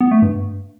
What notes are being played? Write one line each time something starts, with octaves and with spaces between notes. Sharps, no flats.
B3
A3
G2